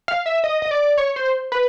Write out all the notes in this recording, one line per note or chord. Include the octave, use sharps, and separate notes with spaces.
F5
E5
D#5
D#5
D5
C#5
C5
B4